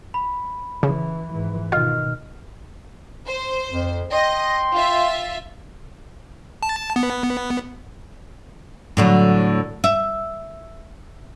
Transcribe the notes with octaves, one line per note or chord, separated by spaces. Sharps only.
B5
C#3 E3
G#2 E3
B2 D#3 F4 D#5 F6
C5
F2
D#5 G5 C6
F4 E5
A5
B3
A2 D3 F#3
E5